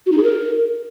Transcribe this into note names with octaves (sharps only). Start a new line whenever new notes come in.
F#4
D#4
G#4
A#4